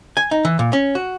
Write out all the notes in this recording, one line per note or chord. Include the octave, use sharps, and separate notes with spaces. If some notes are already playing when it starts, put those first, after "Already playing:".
G#5
D#4
E3
A#2
C#4
F#4